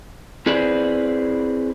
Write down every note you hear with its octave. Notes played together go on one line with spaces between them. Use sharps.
C4 E4 G#4 B4 C5 D5